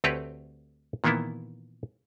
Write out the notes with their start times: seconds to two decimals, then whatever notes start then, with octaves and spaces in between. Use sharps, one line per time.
0.04 D2 A3 C4 G4 B4 C#5
1.04 A#2 D#3 E3 A#3 B3 E4